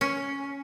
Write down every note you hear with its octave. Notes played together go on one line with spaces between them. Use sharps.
C#4